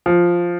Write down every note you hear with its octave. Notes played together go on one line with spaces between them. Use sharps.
F3